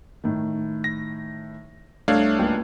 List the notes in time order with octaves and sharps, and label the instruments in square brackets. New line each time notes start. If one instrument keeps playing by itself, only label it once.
[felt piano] A2 D#3
[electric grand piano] A#6
[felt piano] C2 C#5 G#6 [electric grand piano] A3 D4 F5
[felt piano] C#2 A#3 G5